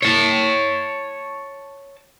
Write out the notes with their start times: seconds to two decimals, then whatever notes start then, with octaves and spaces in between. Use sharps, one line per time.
0.02 C#5 A5